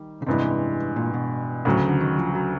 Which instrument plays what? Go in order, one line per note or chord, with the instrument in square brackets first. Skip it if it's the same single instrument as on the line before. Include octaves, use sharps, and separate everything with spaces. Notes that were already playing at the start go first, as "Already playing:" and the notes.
Already playing: [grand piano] D#3 G3
[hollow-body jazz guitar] C#3
[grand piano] A1 G2 E3 G#3 [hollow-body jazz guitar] C3
[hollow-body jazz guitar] A#2
B2
[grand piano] D2 C#3 F#3 [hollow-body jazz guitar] A2
[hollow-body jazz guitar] D3
D#3
F3
F#3